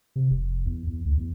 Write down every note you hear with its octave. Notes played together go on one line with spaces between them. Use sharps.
C3
F1
E2
E2
D2
E2